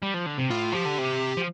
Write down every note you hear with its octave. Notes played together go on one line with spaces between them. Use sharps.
G3
F3
D3
C3
A2 F4
F3 G4
D3
C3
F3